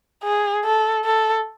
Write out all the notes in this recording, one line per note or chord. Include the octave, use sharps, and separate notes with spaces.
G#4
A4
A4